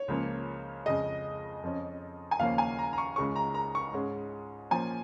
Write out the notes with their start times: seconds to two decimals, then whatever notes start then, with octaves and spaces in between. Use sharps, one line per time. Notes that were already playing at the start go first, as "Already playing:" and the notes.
Already playing: C#5
0.08 C#2 C#3 F3 A#3
0.86 F2 C#3 G#3 D#5
1.63 F2 F3 C#4
2.31 G#5
2.39 D#2 C#3 F3 A#3 C#4 F5
2.58 G#5
2.79 A#5
2.93 A#5
2.98 C#6
3.16 C#2 C#3 G#3 C#4 C#6
3.36 A#5
3.54 A#5
3.75 C#6
3.93 G#2 G#3 C#4
4.71 A#2 F3 A#3 C#4 G#5